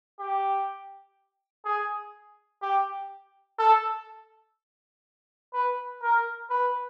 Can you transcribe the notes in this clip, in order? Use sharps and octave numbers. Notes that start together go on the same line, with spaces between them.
G4
G#4
G4
A4
B4
A#4
B4